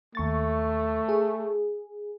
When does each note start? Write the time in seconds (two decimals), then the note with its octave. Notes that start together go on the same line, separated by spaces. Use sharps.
0.15 D#2 A3 C#6 A6
1.09 G#4